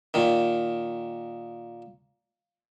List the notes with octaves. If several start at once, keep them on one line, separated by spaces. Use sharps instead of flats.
A#2 D#3